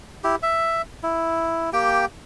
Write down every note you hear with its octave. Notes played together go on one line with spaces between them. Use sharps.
E4 G4
E5
E4
A#3 G4 G5